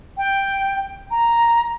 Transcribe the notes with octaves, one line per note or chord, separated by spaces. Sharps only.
G5
A#5